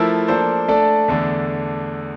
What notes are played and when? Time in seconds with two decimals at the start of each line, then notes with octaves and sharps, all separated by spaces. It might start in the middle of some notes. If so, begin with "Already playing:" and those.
Already playing: F3 A3 E4 A#4
0.28 F3 A#3 D4 A4 C5
0.68 A3 D4 A4 D5
1.08 E2 D3 A3 D4